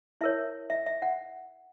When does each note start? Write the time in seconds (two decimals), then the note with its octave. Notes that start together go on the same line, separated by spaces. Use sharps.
0.21 E4 A#4 C#5 E5
0.70 E5
0.86 E5
1.02 F#5